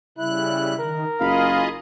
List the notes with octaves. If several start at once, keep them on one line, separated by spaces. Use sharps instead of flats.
C#3 G3 E4 F#6
D#3 A#4
F#1 F4 G#4 D#5 F5 B5